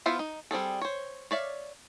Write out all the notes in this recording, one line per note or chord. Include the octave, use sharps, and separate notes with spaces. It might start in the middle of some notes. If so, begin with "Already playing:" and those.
B3 E4 F4 B4 C5
D#4
G3 C4 G#4 A4
C5 C#5
C#5 D5 E5 F5